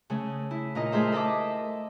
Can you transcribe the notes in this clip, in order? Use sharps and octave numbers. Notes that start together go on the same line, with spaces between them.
C#3 A3 C#4
E4
A#2 D#4 D#5
A3 G#4 A#4 C5 E5
A4 D#5 E5 A5 D6